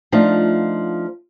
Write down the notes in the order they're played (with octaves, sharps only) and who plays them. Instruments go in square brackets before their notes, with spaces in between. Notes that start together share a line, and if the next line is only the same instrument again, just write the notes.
[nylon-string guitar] F3 A3 D4 D#4 F4